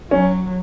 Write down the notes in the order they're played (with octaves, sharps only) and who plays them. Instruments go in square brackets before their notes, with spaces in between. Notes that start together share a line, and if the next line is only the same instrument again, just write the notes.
[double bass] F#3 [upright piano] C#4